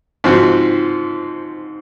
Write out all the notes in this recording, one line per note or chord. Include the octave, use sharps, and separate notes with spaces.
G#2 F3 C4 F#4